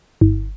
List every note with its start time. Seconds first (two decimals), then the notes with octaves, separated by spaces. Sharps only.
0.21 G1